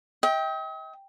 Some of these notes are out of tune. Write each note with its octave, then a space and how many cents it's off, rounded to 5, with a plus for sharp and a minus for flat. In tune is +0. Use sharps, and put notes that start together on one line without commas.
D#5 +45 G5 +0